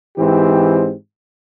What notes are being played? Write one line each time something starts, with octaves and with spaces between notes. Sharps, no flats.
G#2 E3 C4 G4